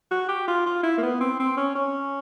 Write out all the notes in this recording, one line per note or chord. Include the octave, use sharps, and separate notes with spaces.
F#4
G4
F4
F4
E4
A#3
B3
C4
C4
C#4
C#4